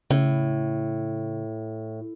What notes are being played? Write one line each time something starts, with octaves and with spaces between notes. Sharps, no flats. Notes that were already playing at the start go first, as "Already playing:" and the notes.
A2 C#3